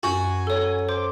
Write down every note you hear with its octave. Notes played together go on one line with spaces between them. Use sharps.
F#2 F#4 G#5
A4 C#5
C5 C6 D6